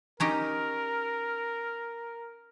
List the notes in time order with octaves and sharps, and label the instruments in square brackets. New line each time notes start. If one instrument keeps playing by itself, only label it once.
[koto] C#4 D#4 G4 [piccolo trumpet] A#4